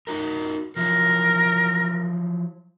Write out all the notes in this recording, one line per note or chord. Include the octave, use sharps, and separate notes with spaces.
D#4 F#4 A#4
F3 F#3 E4 A#4